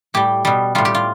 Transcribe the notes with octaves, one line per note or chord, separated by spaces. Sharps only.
A2 G3 G4
B2 G3
A2 G3 F4
G4
F4